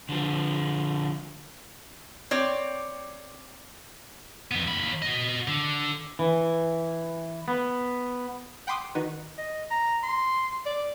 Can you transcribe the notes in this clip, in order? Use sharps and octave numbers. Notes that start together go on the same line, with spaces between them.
D3 F3
C4 C#5 D5
F2 B3
D#2 B5
F#4 D#5
D3
E3
B3
F#5 G5 B5 C6 D6 D#6
D#3 D#4 F#4 B4
D#5
A#5
C6
D5